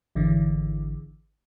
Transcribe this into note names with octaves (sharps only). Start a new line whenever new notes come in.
G#1 D3 E3